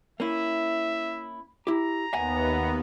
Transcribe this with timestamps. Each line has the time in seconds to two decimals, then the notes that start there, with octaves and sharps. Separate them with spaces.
0.20 A#3 C#4 E4 E5
1.67 E4 G4 A#5
2.13 D#2 B3 E5 F#5 G#5